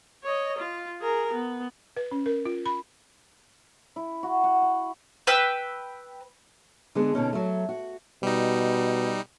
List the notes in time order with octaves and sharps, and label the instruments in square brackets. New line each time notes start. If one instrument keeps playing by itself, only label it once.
[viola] C#5 D#5
F4
G#4 A#4
B3
[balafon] B4
C#4
A#4
F4
B5
[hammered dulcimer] E4
F#4
F#5
E5
[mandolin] B4 G5 E6
[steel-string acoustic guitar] D3 G#3 B3 D4 G#4
B2 D3 C#4 D#4
F#3 A3
F#4
[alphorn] B2 [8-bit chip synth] G3 D#4